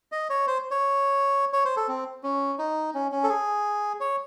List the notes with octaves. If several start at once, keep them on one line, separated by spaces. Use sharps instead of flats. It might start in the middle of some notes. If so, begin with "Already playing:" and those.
D#5
C#5
C5
C#5
C#5
C5
A4
C4
C#4
D#4
C#4
C#4
A4
G#4
C#5